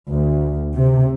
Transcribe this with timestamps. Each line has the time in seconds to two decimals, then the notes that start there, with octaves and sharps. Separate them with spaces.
0.11 D2
0.72 C3